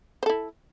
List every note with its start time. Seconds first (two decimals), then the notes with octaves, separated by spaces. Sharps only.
0.23 C5
0.26 A4
0.30 E4